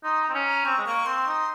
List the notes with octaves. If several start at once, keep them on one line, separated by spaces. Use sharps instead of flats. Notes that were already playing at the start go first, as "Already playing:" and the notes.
D#4 C6
A#5
C4
C#4
A#5
C4 C#6
G#3
A#3 C#6
C4 C6
D#4